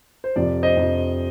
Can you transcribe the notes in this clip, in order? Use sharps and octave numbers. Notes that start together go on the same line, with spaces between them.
C5
F2 C3 F3 D5
C5 D#5
F2 C3 F3